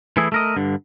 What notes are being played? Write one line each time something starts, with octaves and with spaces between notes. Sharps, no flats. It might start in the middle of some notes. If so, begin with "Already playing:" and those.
E3 A3 E4 G#4
A3 A#4 D#5
G2 D3